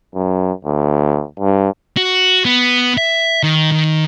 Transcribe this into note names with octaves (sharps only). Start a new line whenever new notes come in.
F#2
D2
G2
F#4
B3
E5
D#3
D#3